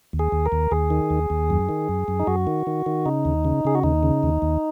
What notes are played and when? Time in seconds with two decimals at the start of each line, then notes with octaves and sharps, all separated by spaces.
0.13 D#2
0.19 G#4
0.32 D#2
0.46 A#4
0.52 D#2
0.71 D#2 G#4
0.90 D#3
1.10 D#2
1.30 D#2
1.50 F#2
1.69 D#3
1.89 F#2
2.08 F#2
2.20 D#4
2.27 F#2 F#4
2.47 D#3
2.67 D#3
2.86 D#3
3.06 C#3 D#4
3.25 D#2
3.45 C#3
3.65 C#3 G#4
3.75 F#4
3.83 D#2 D#4
4.03 C#3
4.23 D#2
4.42 D#2